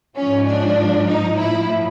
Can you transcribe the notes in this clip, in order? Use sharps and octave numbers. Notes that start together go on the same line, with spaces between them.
G#2 F3 C#4
D4
D#4
A2 F3 E4